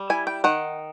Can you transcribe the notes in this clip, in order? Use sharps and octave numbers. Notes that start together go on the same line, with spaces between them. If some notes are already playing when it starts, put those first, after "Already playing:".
Already playing: G3
E4 G#5
G5
D#3 F#5